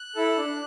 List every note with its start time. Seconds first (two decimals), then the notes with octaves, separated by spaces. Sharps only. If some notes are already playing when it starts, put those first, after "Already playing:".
Already playing: F#6
0.15 E4 A4
0.37 D4